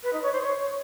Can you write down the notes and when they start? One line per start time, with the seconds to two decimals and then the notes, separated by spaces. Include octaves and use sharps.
0.03 B4
0.13 D#4
0.22 C#5
0.32 C5
0.41 C#5